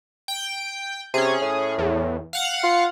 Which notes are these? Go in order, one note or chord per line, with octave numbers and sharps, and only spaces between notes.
G5
C3 C#4 G#4
A2
E2
F5 F#5
F4